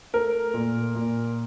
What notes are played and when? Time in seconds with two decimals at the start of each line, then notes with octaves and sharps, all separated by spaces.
0.13 A3 A#4
0.54 A#2
0.95 A#2